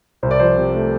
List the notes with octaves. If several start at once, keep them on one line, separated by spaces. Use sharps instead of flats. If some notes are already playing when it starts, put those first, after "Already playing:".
C2 C5
D5
F3 C5
C3
A3